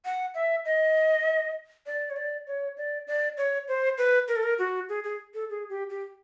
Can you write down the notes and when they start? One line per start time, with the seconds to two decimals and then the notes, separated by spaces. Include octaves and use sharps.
0.05 F#5
0.35 E5
0.65 D#5
1.86 D5
2.10 C#5
2.16 D5
2.47 C#5
2.77 D5
3.07 D5
3.37 C#5
3.68 C5
3.98 B4
4.28 A#4
4.36 A4
4.43 A#4
4.59 F#4
4.89 G#4
5.04 G#4
5.34 A4
5.50 G#4
5.70 G4
5.90 G4